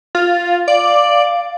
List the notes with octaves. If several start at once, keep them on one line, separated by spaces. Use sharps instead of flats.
F4
D5 F5